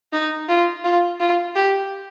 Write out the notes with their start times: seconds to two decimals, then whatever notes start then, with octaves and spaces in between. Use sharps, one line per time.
0.13 D#4
0.48 F4
0.84 F4
1.20 F4
1.56 G4